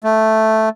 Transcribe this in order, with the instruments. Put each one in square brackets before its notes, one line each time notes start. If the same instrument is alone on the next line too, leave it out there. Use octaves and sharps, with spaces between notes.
[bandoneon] A3